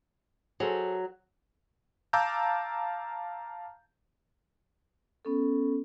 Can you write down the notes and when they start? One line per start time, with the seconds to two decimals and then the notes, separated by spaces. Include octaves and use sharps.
0.60 F#3 G#4 A4 C5
2.13 F5 A5 A#5 D6 E6 G6
5.25 B3 C#4 A4